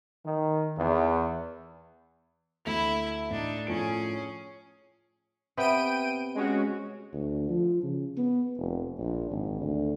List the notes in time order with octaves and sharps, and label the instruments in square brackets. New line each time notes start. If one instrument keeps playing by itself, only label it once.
[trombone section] D#3
E2
[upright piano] D2 E5 F7 [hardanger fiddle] E4
[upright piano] A2 [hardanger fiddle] D4 D#4
[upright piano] A2 F3 D7 [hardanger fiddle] C#4 G#4
[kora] C3 B3 B4 [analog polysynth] G5 D7 D#7
[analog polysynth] G#3 C#4 F#4
[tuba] D2
F3
C#3
B3
F1
A#1
G#1
D2